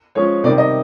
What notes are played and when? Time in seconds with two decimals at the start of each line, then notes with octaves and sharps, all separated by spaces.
0.15 F3 G#3 C#4 C#5
0.44 C3 D#3 G3 D5
0.58 D#5